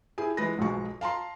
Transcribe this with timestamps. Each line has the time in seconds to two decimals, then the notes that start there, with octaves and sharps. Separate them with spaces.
0.18 E4 G4 G#4 G#5
0.37 E3 G#3 B4 A#6
0.58 B1 G#2 B2 F3 G#3 C#6
1.01 F5 A5 A#5 C6